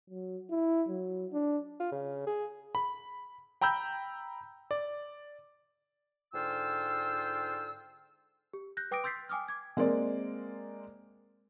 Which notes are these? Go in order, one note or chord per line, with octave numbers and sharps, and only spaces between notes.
F#3
E4
F#3
D4
F4
C#3
G#4
B5
G5 A#5 B5 E6 G6
D5
G#2 D3 F4 G5 E6
G4
F#6 G6 A#6
B4 G5 D6 D#6 A#6 D7
C6 E6 G6 A6 B6 C7
G5 G#5 D6 D#6 F6
D6 G#6
G#3 A#3 C4 D5